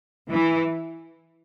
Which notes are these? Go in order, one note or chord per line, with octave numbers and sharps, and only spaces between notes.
E3